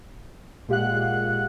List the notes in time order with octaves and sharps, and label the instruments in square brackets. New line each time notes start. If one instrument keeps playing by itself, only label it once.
[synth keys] A#2 G#3 G4 F5 F#5 F#6